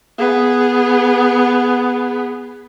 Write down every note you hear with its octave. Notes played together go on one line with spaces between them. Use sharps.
B3 G#4